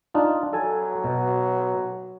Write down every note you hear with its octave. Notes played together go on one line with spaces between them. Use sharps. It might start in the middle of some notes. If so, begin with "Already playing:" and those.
D4 D#4 F4
F#3 A4 G#5
B2